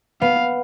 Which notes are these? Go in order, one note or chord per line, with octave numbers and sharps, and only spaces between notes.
B3 F5